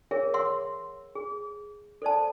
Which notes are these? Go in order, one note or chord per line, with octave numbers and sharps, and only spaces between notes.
G#4 A#4 C#5 E5
C#5 E5 F#5 C6 E6
G#4
A4 C5 D5 A5